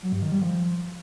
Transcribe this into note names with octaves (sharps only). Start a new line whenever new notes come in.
F#3
G2
D#3
G3
F3